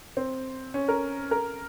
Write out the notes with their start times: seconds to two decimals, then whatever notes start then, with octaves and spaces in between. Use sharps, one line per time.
0.17 C4
0.74 C#4
0.88 A#4
1.31 A#4